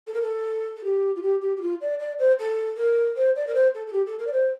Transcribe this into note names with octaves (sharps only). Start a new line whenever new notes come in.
A4
A#4
A4
A4
G4
F4
G4
G4
G4
F4
D5
D5
C5
A4
A#4
C5
D5
A#4
C5
A4
A4
G4
A4
A#4
D5
C5